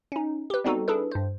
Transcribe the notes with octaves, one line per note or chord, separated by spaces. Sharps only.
C#4 D#4
G4 B4
G3 B3 C4 D#4 F#4 A4
D4 E4 G#4 A4 B4
G2 C5